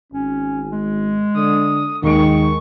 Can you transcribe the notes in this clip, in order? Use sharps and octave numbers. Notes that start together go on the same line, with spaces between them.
G#1 C#4
G#3
D3 D#6
D#2 D#3 G#3 C#6 D7